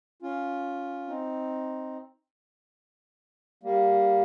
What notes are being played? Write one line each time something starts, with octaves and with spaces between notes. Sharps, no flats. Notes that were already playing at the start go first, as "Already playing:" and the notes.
C#4 F4
C4 D#4
G3 A#3